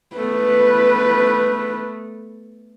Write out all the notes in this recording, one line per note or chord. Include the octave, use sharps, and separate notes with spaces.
A3 B3 B4